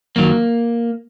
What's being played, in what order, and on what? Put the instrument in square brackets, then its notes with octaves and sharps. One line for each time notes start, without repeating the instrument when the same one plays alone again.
[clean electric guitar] F#2 D#3 F#3 A#3